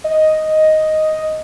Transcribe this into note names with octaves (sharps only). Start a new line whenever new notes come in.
D#5